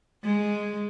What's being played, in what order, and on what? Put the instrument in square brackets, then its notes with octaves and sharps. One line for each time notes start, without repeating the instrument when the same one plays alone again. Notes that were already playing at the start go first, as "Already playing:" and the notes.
[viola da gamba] G#3